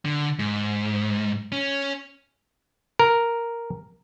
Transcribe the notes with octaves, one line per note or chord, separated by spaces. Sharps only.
D3
G#2
C#4
A#4